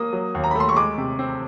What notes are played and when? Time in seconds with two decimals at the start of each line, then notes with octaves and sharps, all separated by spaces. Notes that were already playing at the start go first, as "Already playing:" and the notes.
Already playing: A#3 D#6
0.13 F#3
0.35 D#2
0.44 A#5
0.51 B5
0.55 A3 C6
0.69 C#6
0.76 G#3 D6
0.98 C3
1.19 C4